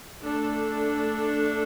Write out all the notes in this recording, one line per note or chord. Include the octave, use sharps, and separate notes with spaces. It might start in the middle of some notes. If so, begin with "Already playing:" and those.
A3 D4 A4